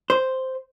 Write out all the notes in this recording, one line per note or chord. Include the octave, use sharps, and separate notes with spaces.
C5